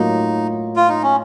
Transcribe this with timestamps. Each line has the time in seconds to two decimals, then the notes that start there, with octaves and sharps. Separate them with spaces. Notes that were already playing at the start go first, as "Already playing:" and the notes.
Already playing: A2 F#3 A#3 D#4 F4
0.76 F4
0.89 D#4
1.03 C#4